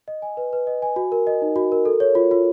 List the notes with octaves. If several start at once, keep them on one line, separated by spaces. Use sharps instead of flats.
D#5
G#5
B4
B4
D#5
G#5
F#4
A#4
D#5
D#4
F#4
A#4
A4
C#5
F4
F4